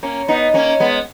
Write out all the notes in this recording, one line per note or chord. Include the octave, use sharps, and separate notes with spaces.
A#3 C#4
B3 D#4
A#3 C#4
G#3 B3